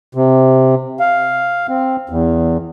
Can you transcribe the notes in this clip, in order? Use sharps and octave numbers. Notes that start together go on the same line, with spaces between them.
C3
F5
C4
E2